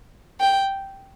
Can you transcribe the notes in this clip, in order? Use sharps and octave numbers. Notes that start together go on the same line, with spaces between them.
G5